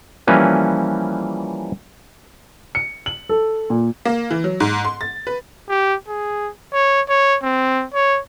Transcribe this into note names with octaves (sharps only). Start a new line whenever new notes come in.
E3 F3 G3 A#3 C#4 B4
C#7
F#7
A4
A#2
A#3
E3
F#3
G#2
C6
A6
B4
G4
G#4
C#5
C#5
C4
C#5